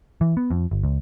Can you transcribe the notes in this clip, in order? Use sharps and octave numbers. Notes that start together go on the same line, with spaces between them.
E3
B3
F2
G1
C#2